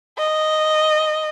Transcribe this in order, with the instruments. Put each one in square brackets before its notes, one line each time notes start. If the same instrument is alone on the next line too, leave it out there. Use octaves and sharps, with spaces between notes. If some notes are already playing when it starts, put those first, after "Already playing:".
[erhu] D#5